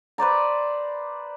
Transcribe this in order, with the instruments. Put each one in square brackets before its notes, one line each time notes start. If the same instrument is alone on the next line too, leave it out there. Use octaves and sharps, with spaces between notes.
[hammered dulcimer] B4 C5 D5 A#5